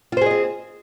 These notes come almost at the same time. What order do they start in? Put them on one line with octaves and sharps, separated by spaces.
F4 C5 G#4 D#5 C4